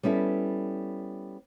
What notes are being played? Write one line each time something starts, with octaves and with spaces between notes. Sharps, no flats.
G3 B3 C#4 E4 A4